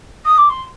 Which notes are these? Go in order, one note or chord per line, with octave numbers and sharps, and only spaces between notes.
D#6
D6
C6